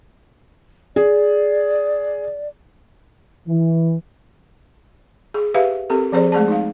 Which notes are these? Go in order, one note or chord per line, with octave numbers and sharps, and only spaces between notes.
G#4 D5
E3
G#4
G4 B4 E5 F5
C4 G4 A4 A#4
F3 C4 G#4 C5 D5
G#3 A3 G#4 D5 A5
D#4 F5